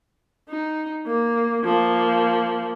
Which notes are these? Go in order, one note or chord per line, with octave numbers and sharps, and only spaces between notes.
D#4
A#3
F3 A#3